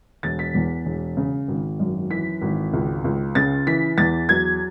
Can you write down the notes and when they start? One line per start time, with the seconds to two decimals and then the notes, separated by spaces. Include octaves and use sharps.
0.23 E1 A6
0.39 B6
0.55 E2
0.85 E1
1.17 C#3
1.48 G#1
1.80 F#2
2.10 E3 B6
2.42 G#1
2.73 C#2
3.04 C#2
3.35 C#3 A6
3.67 E3 B6
3.98 E2 A6
4.29 F#3 G#6